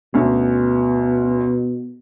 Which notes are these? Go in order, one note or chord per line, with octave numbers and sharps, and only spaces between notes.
D2 B2 C#4